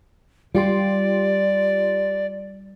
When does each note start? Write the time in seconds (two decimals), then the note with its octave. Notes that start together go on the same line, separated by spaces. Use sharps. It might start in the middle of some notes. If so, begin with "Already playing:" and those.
0.55 G3 F4 G4 D5 C6